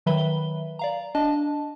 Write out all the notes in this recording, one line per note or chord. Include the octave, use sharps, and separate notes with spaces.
D#3 F#3 B4 E5 B5 G7
D5 F5 A#5
D4 D#5 A5